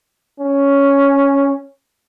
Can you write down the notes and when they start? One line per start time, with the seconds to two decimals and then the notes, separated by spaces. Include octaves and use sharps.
0.40 C#4